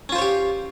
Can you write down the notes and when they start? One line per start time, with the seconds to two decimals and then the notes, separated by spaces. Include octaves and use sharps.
0.09 C#4
0.12 F4
0.15 C5
0.18 C#5
0.22 G4